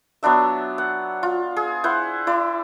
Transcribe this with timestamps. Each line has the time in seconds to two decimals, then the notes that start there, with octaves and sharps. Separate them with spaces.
0.23 F#3 B3 D4 E5
0.78 F#5
1.23 F4
1.56 G#4
1.84 E4 C5 F#5
2.27 E4 D5